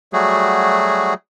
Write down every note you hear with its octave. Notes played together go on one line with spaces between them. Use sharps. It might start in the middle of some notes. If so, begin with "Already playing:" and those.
F#3 G3 A3 F#4 G#4